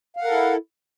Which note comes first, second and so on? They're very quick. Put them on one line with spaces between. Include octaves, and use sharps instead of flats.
F5 F#5 A#4 A4 E4